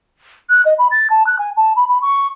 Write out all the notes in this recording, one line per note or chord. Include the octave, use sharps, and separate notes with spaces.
F#6
D#5
B5
A6
A5
F#6
G#5
A5
B5
B5
C#6